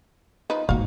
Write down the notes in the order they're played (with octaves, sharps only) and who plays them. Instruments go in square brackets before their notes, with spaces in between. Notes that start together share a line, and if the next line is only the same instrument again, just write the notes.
[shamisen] F3 D#4 B4
[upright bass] G#2 A#3 [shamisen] F#4 F5